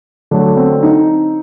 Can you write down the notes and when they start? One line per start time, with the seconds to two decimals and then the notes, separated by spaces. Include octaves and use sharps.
0.31 D3 F#3 A3 D4
0.57 C4
0.83 D#4